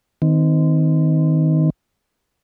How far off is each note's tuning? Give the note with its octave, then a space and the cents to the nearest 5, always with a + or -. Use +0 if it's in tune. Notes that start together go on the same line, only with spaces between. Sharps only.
D#3 +15 C4 -25